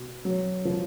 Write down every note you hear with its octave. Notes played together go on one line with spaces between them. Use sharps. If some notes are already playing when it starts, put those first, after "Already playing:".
Already playing: B2
F#3
F3